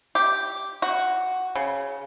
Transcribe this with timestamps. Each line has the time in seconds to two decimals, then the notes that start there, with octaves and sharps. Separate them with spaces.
0.15 G4
0.82 F#4
1.55 C#3